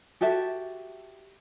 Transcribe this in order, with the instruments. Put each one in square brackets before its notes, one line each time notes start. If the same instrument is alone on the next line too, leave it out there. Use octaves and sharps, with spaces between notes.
[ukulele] F#4 G4 A4 E5